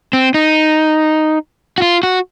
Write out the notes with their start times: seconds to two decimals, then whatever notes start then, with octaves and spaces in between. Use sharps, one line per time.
0.13 C4
0.34 D#4
1.78 F#4
1.82 F4
2.03 F#4